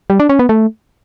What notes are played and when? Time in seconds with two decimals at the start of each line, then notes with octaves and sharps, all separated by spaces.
0.10 G3
0.20 D4
0.29 C#4
0.39 B3
0.49 A3